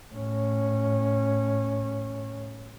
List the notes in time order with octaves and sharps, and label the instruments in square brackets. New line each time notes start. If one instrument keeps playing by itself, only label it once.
[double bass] A2 C#4